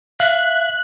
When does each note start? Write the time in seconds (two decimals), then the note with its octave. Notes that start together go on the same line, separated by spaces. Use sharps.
0.20 E5 F5 F#6